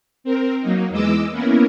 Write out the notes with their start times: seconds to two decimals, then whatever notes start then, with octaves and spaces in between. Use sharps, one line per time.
0.24 C4 A#4
0.61 F#3 A#3 D#4
0.90 E2 E3 G#3 D#5 D6 E6
1.31 A#3 B3 C#4 E4 A#4